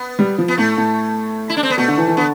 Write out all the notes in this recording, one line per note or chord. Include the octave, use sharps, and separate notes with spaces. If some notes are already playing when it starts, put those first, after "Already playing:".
Already playing: B3
G3
F3
B3
A2 A3
A2
E4
D4
C4
B3
B2 A3
D3
E3
E3
D3 B3